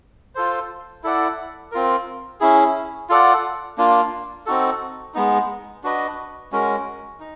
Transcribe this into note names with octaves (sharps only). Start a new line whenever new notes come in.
F4 A4 C5
E4 A4 D5 F#5
C4 F4 A#4
C#4 E4 G#4
F4 A4 D5 F#5
A#3 D4 F4
C4 D#4 F#4 A4
G#3 B3 D#4
D4 F#4 B4 D#5
G#3 C#4 F#4 A#4
D#4